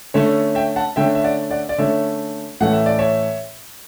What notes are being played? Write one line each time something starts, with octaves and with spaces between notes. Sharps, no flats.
D3 A3 C#4 C#5 E5
E5 G5
F#5 A5
D3 A3 C#4 E5 G5
E5
D5 F#5
D5 F#5
D5
D3 A3 C#4 C#5 E5
A2 E3 A3 C#4 F#5
E5
D5
C#5 E5